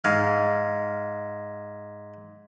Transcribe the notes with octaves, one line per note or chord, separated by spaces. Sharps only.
G#2 F5